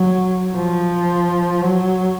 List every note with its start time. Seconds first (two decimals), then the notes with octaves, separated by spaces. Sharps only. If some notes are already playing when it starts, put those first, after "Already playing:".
Already playing: F#3
0.54 F3
1.61 F#3